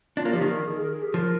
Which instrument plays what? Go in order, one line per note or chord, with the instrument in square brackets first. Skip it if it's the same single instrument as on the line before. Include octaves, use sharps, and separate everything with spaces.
[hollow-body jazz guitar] D4 [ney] F4
[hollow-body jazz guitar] A#3
[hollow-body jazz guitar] F3 [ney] G4
[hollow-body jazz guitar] D#3
[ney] A#4
G#4
A#4
G#4
G4
[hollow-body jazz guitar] F3 [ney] A#4